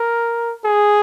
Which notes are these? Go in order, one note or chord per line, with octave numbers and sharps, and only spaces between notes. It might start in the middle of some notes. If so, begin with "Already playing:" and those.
Already playing: A#4
G#4